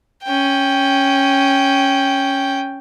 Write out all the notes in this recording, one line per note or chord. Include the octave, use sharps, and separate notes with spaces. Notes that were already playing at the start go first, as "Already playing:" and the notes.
C#4 G5